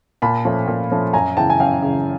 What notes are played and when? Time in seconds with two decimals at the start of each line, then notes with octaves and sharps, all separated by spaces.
0.22 A#2 A5 B5
0.45 F3 A3 C#4
0.67 A#2
0.91 F3 A3 C#4
1.13 F#2 G#5 A#5
1.37 C#3 E3 G5 A5
1.50 G#5
1.60 F#2 F5 G5
1.82 C#3 E3